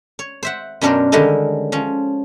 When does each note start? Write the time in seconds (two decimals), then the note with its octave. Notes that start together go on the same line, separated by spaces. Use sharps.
0.19 C#5
0.43 C5 E5 F#5
0.81 F#2 B2 C#4 D4 A#4 C5
1.12 D3 D#3 G3 G#3 C#4 A4
1.72 F3 C#4